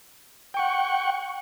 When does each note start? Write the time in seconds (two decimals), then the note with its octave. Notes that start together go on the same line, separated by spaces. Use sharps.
0.54 G5
0.57 C#6
0.59 F#5